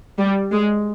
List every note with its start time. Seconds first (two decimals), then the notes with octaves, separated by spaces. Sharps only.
0.18 G3
0.52 G#3